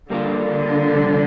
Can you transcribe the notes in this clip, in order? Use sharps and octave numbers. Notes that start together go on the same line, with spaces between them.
D3 G3 A#3 D4 F4
F2 C3 G3